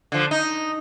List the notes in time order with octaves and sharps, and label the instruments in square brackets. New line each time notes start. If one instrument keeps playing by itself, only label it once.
[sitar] D3 F3
D#4